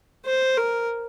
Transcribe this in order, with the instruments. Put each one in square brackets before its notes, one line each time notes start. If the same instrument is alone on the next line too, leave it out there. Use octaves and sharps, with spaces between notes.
[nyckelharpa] C5
A#4